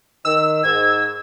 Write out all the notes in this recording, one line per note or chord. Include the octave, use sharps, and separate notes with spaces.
D#3 E6
G#2 G#6